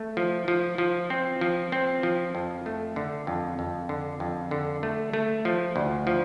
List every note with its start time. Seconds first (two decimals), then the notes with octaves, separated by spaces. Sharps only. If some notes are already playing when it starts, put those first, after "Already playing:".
Already playing: A3
0.17 F3
0.48 F3
0.78 F3
1.10 C4
1.41 F3
1.72 C4
2.03 F3
2.35 F2
2.66 A3
2.96 D3
3.27 F2
3.59 F2
3.89 D3
4.20 F2
4.51 D3
4.83 A3
5.13 A3
5.45 F3
5.76 D2
6.07 F3